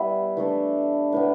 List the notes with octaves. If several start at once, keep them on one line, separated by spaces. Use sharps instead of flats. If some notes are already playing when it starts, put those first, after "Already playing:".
Already playing: G3 B3 E4
E3 A3 D4
A2 E3 B3